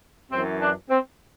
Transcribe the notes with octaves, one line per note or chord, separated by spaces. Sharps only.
F#2 E3 C4
D4
C4